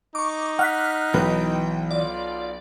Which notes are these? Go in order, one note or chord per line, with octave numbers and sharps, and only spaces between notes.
D#4 C#6 D6
F#5 F6 F#6 B6
B1 B2 E3 B4 G5
F4 D5